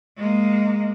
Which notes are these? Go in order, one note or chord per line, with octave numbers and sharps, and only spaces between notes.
G#3 A#3